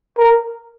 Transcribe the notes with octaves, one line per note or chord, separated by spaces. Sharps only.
A#4